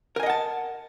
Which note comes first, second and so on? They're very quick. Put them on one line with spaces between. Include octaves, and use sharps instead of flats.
A#4 G#5 D#5 F#5 A5